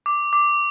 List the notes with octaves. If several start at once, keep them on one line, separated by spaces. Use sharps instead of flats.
D6
D6